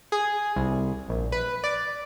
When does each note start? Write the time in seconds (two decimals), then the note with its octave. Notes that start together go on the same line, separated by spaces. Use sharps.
0.12 G#4
0.56 C2
1.09 A#1
1.32 B4
1.64 D5